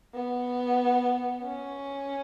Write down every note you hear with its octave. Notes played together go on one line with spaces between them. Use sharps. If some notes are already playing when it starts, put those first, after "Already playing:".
B3
C#4